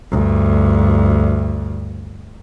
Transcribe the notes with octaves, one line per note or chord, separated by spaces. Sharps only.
D2 G2